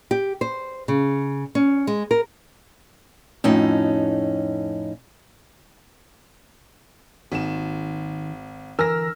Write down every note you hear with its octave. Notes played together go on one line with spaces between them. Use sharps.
G4
C5
C#3
C#4
G#3
A#4
F2 A2 C#4 D#4
G#1 D#2 D#3 G#4 E7
D3 E3 A#4 G#5 E6 F6 A#6